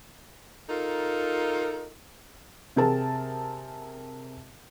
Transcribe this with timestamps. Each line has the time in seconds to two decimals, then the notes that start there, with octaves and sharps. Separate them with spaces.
0.69 D#4 F4 A4 A#4
2.76 C3 C4 G#4 A#4 A5